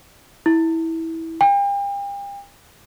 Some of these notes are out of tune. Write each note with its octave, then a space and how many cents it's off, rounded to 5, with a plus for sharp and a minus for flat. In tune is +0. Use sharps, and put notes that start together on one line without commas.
E4 -15
G5 +40